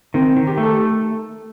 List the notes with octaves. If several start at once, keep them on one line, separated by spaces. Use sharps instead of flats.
D#3 C4
D#3
G4
A3
A4